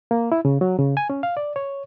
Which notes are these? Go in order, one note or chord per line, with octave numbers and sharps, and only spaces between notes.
A#3
E4
C#3
F#3
C#3
G#5
C#4
F5
D5
C#5